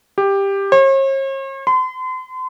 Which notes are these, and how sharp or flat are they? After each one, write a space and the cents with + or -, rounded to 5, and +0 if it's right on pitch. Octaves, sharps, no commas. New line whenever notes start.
G4 +10
C#5 -45
C6 -40